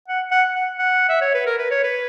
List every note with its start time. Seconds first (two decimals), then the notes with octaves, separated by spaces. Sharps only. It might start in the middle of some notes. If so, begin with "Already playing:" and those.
0.08 F#5
0.31 F#5
0.55 F#5
0.79 F#5
1.09 E5
1.21 C#5
1.34 B4
1.46 A#4
1.58 B4
1.71 C#5
1.84 B4